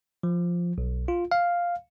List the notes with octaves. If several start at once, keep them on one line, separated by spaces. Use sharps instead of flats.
F3
B1
F4
F5